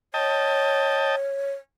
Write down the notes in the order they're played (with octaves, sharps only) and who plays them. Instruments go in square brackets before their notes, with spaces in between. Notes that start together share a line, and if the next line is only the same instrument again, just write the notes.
[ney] C#5 [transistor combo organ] D#5 G5 A5